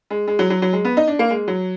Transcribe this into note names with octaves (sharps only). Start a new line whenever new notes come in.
G#3
G#3
F#3
F#3
F#3
G#3
B3
D#4
D4
A#3
G#3
F#3